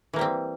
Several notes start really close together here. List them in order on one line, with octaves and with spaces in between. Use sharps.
E3 A#3 G3 C4